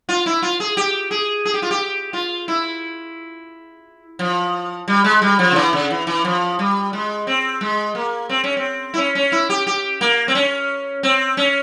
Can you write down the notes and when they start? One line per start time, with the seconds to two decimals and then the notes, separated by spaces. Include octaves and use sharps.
0.09 F4
0.26 E4
0.42 F4
0.60 G#4
0.77 G4
1.11 G#4
1.45 G#4
1.54 G4
1.62 F4
1.71 G4
2.13 F4
2.48 E4
4.19 F3
4.88 G3
5.04 G#3
5.22 G3
5.39 F3
5.52 C#3
5.56 E3
5.73 C#3
5.91 E3
6.07 E3
6.25 F3
6.59 G3
6.93 G#3
7.27 C4
7.61 G#3
7.95 A#3
8.29 C4
8.44 C#4
8.57 C4
8.94 E4
8.98 C#4
9.15 C#4
9.32 E4
9.50 G4
9.67 G4
10.01 A#3
10.28 C4
10.35 C#4
11.03 C4
11.37 C#4